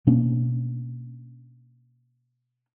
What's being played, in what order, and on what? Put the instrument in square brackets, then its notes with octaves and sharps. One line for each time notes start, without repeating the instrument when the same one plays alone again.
[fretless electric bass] B2 A#3 C#4 D4